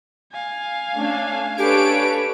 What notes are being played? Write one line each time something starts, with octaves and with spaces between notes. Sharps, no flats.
F5 G#5
A3 C#4 D4
D4 G4 A4 B4 C#5 D7